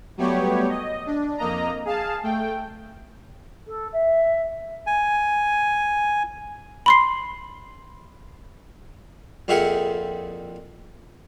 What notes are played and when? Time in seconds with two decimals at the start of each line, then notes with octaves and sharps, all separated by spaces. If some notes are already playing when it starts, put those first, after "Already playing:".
0.17 F#3 G3 A3 B3 G4 C#5
0.70 D#5
1.06 D4
1.38 F2 A#3 D#5 A#5
1.85 G#4 F5 A5
2.23 A3 G5
3.67 A4
3.92 E5
4.87 G#5
6.86 B5 C6 C7
9.48 F2 A#2 E4 G4 G#4 F#5